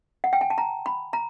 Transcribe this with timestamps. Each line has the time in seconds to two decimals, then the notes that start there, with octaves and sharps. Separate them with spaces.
0.24 F#5
0.33 G5
0.41 G#5
0.50 A5
0.58 A#5
0.86 B5
1.13 A#5